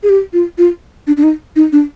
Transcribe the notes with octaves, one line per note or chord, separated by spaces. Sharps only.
G#4
G4
F4
F4
D4
D4
D#4
D#4
D4